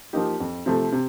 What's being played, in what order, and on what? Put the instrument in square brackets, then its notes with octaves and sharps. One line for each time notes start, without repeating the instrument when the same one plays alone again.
[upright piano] F3 A#3 D#4 G4
F2
C3 F3 A3
C3